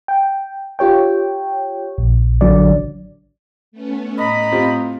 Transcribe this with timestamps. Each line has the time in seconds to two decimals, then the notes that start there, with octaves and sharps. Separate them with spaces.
0.08 G5
0.79 F4 G4 C#5 G5
1.98 A#1
2.41 A1 D3 F#3 D5
3.72 A3 B3 C#4
4.19 A2 D#5 A#5 B5
4.52 C4 F4 G4